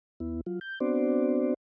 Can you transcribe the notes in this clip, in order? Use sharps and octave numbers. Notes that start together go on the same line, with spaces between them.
D#2 B3 E4
F#3 F4
G6
B3 C4 D4 F#4 C5 D5